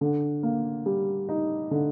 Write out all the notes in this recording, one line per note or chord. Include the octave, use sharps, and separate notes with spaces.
D3
A#3
G3
D#4
D3